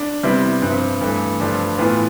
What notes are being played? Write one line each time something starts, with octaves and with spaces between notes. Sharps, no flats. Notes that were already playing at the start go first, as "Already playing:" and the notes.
Already playing: D4
C3 G3 B3 E4
G2 F3 C4
G2 E3 A3
G2 F3 A3 D4 F4
A2 E3 B3 F4